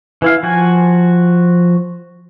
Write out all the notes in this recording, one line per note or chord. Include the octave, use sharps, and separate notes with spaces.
E3 E4 F5
F3 F#4 G#5